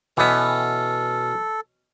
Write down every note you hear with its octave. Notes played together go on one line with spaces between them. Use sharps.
B2 E3 B3 C#4 A4